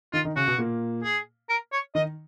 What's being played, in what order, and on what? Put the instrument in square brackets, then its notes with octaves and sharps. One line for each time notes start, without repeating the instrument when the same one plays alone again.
[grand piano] D#3 D#4 [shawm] F4
[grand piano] D#3 D#4
[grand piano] C#3 C#4 [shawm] F#4
[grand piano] B2 B3
A#2 A#3
[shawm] G#4
A#4
C#5
[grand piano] D#3 D#4 [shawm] D#5